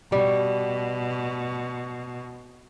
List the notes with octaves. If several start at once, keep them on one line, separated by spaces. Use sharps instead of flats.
B2 G3